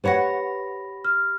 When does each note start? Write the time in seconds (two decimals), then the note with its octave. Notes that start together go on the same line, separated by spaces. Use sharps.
0.04 G4 B4 C#5 F#5 B5 A#6
1.05 F6